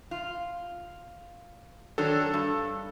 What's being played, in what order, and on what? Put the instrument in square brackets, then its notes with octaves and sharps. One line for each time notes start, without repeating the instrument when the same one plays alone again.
[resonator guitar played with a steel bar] F4
[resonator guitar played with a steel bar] D#3 F#3 D4 [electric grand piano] A4
[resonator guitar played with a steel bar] G2